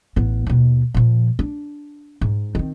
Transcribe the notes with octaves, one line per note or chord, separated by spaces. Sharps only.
A1 B3
D#2 B2
A#2 F3
D4
G#2
D#3 C4